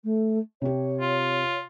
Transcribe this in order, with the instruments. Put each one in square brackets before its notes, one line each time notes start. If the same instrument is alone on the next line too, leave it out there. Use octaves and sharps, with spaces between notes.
[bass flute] A3
[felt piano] C3 G4 [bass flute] C#5
[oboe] F4